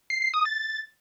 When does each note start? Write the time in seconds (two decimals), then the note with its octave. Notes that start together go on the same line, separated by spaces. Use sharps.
0.10 C7
0.22 C7
0.34 D#6
0.45 A6